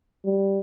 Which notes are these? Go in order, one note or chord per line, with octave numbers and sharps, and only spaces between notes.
G3